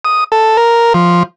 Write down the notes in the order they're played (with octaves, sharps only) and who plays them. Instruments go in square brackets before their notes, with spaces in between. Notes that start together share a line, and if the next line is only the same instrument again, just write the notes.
[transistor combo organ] D#6
A4
A#4
F3